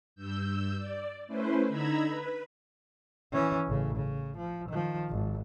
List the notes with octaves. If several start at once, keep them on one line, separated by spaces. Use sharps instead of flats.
G2 E6 G6
D5
A3 C#4 E4 B4 C5
D3 D#4 A#5 B5 E6 G#6
B4
E3 C#4
A1 C#3
C#3
F3
D#3 F3
G#1